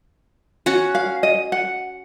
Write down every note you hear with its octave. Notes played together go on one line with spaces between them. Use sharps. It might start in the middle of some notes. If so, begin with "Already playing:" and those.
C#4 F#4 F#5
F5
D#5
F#5